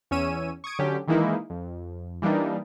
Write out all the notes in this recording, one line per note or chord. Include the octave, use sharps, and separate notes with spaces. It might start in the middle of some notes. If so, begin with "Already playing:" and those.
E2 C#4 C#5 E6 D#7
C#6 D#6 G#6 D7
D3 F#3 C#4 G4
D#3 E3 G#3 A#3 D#4 E4
F2
E3 G3 A#3 D4 D#4